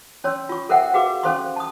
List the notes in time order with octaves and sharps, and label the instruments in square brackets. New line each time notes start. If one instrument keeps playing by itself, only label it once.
[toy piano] C#4 C#5 C6 E6
F4 C#6
A4 A#4 C5 E5 F#5 G5
F#4 G#4 B4 F5 D6
C#4 A4 C5 F5 C6 C#6
A5 D#6